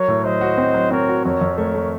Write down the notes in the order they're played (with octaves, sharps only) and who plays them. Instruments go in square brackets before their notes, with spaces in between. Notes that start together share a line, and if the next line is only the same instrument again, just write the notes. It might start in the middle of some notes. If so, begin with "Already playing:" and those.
Already playing: [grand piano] F#3 [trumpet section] A#4 C#5
[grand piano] A2
[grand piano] F#3 [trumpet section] C5 D#5
[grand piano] F#4
C4
F#3
[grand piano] C4 [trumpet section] A#4 C#5
[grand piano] F#4
[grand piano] F2 [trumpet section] A#4 C#5
[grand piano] F2
[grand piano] A3 [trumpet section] A#4 C#5
[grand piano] A3